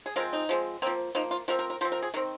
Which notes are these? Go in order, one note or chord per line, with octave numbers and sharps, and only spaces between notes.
G#4
F3 G#3 C4 A#4
D#4
F3 G#3 C4
F3 A#3 C4
F3 A#3 D#4
F4
F3 C4 A#4
A#4
A#4
F3 C4 C5
A#4
G#4
D#3 C4 A#4